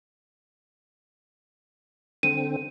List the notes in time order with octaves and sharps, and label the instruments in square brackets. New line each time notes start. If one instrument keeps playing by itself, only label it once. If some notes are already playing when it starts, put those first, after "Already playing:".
[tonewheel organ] D3 C4 [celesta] D#7